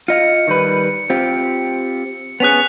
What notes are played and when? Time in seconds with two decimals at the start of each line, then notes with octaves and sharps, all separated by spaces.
0.08 F4 D#5 F5 C#7
0.47 D#3 G3 B4
1.10 C4 F4 G4
2.40 B3 C#4 G#4 F#6 B6 F7